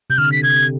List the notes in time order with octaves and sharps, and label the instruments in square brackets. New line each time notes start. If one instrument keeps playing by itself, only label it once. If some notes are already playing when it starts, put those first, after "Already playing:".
[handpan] C3 [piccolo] G6
[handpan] D3 [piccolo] F6
[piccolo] B6
[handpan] C3 [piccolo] G#6